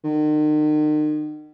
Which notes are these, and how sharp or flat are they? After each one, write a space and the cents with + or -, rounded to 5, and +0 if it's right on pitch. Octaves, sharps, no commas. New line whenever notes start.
D#3 -40